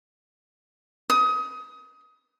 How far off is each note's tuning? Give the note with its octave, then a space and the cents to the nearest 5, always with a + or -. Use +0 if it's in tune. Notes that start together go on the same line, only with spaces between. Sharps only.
D#6 +25